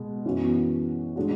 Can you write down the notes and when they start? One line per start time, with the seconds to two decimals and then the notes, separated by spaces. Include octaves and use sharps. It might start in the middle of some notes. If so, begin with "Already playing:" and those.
Already playing: B2 G#3
0.25 F#2 E3 B3 F#4
1.16 B2 G#3 D4 F#4